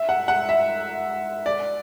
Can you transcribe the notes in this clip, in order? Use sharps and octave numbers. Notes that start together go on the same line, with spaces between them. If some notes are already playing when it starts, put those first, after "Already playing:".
Already playing: E5
F#5
F#5
E5
D5